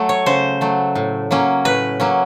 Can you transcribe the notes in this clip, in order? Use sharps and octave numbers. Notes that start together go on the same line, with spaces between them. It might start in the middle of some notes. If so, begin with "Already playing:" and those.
Already playing: F#3 A3
C#5
C#3 C5
F#3 A3
A2
F#3 A#3 C#4
A2 B4
F#3 A#3 C#4